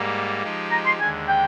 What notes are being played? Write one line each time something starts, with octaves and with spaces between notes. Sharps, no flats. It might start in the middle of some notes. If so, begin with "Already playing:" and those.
Already playing: G#2 G3 A#3
F3 G#3 D#4 G4
A#5
C6
D#2 D3 G#3 G#5
G5